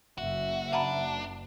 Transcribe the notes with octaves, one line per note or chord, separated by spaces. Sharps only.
F#1 F#4 E5
D4 F#5 A#5 B5